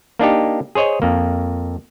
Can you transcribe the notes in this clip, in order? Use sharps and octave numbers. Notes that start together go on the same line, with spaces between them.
A#3 D4 D#4 G4
G#4 C5 C#5 D#5
F2 A#3